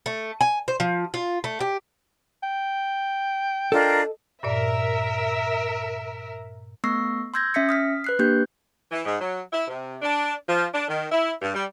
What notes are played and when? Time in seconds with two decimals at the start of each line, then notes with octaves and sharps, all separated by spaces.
0.06 A3
0.41 G#5
0.68 C5
0.80 F3
1.14 F4
1.44 A3
1.61 G4
2.43 G5
3.72 D4 F4 A4 A#4 D#5 A5
4.43 G2 A#2 A#4 D5 E5
6.84 A3 B3 C#6 E6 A#6 C7
7.34 C6 E6 G6 G#6 A#6
7.54 C#4 E5 A#6 B6 C#7
7.69 D#6 F6 B6
8.04 B4 F#6 C7
8.19 A#3 D4 G4 G6
8.92 E3
9.06 G#2
9.21 F#3
9.53 E4
9.68 C3
10.02 D4
10.48 F3
10.72 D4
10.89 D#3
11.12 E4
11.42 G2
11.55 G3